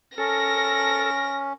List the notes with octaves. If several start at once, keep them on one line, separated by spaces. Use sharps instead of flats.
C#4 A4 A#4 A#6